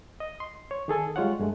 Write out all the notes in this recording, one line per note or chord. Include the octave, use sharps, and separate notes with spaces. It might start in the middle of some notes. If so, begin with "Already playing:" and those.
D#5
C6
C#5
D#3 G#4 A4 G#5
G3 G#3 F4 C#5 F#5
G2 G#3 A3